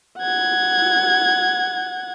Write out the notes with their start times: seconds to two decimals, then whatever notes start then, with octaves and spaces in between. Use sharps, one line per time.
0.19 F#5 G#6